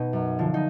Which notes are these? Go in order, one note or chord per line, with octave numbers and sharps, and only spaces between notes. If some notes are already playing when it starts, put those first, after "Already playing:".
Already playing: B2 D#4
F#2
D3 F3
D#4